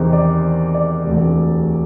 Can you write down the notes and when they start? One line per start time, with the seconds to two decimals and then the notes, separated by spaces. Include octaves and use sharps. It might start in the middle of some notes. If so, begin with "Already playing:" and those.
Already playing: E2 C3 D#3 C5
0.13 D5
0.74 D5
1.05 E1 D2 C3